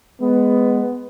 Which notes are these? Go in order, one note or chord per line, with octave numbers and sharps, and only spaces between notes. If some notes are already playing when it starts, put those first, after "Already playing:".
G#3 B3